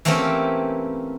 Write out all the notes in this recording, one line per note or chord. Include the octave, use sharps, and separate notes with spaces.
E3 A3 A#3 C4 C#4 G4